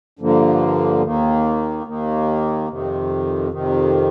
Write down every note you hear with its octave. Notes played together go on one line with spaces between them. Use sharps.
G2 D3 F3 A#3
D#2 D#3 A#3
D#2 D#3 A#3
F2 C3 D#3
F2 C3 D#3